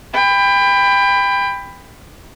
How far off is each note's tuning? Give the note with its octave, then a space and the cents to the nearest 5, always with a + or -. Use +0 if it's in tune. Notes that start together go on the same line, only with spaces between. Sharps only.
G5 +25 B5 +15